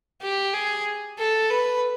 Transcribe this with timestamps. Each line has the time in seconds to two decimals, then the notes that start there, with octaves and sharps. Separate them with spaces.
0.22 G4
0.54 G#4
1.19 A4
1.50 B4